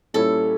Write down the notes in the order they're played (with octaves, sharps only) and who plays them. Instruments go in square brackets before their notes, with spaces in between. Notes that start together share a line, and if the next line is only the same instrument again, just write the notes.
[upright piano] A#2 G3 C#4 E4 [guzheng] A4